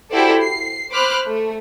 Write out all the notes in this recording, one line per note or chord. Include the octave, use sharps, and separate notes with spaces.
E4 F#4 G4 A4 C5 D5
C7
C5 B5 D6 F6 F#6
A3